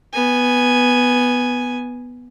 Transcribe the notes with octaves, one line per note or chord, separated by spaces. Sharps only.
B3 G#5